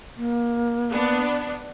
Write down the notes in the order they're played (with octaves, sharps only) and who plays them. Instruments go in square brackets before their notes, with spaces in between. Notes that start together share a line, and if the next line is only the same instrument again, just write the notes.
[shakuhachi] A#3
[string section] B3 D4